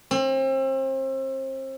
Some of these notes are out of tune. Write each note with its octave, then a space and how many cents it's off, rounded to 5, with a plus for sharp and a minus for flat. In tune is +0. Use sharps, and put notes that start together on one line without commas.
C4 +35